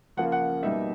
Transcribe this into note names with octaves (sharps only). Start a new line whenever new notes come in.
C#3 F3 A#3 F#5
F#5
B2 G3 A#3 D#4 E5